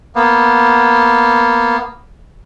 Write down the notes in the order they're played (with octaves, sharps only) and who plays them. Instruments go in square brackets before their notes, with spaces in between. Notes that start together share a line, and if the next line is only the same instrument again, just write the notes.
[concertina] A#3 B3